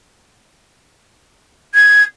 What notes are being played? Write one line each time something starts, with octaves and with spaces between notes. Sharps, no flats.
G#6